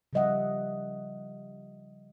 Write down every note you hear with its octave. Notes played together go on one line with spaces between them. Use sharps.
C#3 F3 G3 D#5 E5 F#5